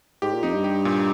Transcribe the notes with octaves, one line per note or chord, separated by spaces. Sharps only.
G#2 G4
A#2
F2 D#4
G2
G4
A#2